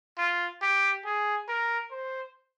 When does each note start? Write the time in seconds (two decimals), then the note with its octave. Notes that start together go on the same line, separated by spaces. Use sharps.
0.18 F4
0.62 G4
1.05 G#4
1.48 A#4
1.91 C5